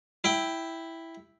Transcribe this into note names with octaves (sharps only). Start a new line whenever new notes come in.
E4 G5